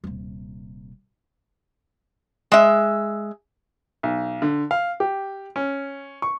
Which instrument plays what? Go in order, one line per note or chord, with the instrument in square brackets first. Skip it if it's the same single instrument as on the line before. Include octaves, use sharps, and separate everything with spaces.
[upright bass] D#1 C3
[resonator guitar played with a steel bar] G#3 E5
[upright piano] B1
D3
F5
G4
C#4
C#6